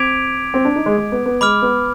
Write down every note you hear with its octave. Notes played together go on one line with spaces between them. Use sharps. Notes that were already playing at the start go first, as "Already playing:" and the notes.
Already playing: C4 D6 G#6 B6 D7 F7
C4
D4
D#4
G#3
G#3
B3
B3
G#3 B5 D6 F6
B3